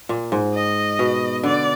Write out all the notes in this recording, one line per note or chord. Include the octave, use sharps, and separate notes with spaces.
A#2
G#2
D#5
B2
D3 D5